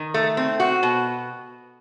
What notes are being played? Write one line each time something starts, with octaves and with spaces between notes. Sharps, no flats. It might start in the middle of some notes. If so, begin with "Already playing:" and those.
Already playing: D#3
A3
C4
F#4
B2